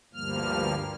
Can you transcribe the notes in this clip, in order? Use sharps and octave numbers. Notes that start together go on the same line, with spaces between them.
D2 G2 F3 G3 A#3 F6